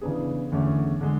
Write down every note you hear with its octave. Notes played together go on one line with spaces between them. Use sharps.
C#3 E3 B3 D4 G#4
E2 D3 A3 C#4
D3 G#3